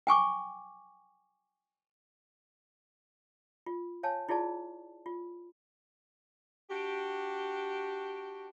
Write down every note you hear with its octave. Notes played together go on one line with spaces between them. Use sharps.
G5 G#5 C#6 D6
F4
C#5 F5 G#5 A5
E4 F4 G#4 D5 A5
F4
D4 F#4 G4